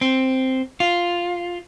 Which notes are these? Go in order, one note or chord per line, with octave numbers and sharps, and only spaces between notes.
C4
F4